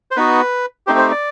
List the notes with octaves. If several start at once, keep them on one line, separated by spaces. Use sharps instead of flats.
C5
B3 D#4 F#4 B4
A3 C4 D#4 G4 C5
C5
D5